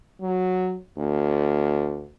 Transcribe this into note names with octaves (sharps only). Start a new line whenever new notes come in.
F#3
D2